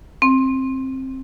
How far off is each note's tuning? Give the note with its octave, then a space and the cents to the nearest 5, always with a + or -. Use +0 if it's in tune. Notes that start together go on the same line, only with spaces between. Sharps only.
C4 +15